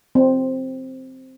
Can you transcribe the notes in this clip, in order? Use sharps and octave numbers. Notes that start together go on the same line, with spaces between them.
C4